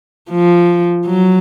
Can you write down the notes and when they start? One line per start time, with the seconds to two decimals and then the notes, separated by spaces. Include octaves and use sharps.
0.30 F3
1.06 F#3